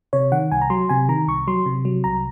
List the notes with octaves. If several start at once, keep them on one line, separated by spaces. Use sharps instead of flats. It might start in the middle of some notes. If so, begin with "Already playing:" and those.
C3 C#5
D#3 F#5
C2 G#5
A#5
F#3 C6
C3 G#5
D#3 A#5
C2 C#6
F#3 C6
C3
F#3
C2 A#5